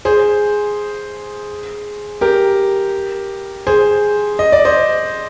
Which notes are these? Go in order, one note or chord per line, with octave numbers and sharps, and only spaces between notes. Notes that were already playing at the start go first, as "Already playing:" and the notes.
G#4 C5
G4 A#4
G#4 C5
D#5
D5
C5 D#5